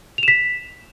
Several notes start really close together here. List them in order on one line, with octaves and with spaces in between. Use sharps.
F7 E7 B6